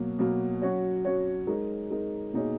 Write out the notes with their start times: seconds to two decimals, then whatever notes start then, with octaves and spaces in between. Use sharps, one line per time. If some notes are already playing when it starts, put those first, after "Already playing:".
Already playing: B2 F#3 A#3
0.19 B2 F#3 A#3
0.62 F#3 C#4 F#4 C#5
1.05 F#3 C#4 F#4 C#5
1.47 G#3 D#4 A#4
1.90 G#3 D#4 A#4
2.33 B2 A#3 D#4 G#4 C#5